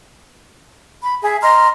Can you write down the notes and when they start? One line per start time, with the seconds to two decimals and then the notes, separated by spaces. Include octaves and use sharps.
1.03 B5
1.21 G#4 E5
1.42 D#5 A#5 C6 F6